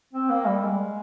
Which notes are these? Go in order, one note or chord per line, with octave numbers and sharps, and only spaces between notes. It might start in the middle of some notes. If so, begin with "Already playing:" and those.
C4
A#3
G3
G#3